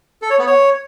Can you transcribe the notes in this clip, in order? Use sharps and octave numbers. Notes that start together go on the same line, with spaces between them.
A4
C#5
B3
C#5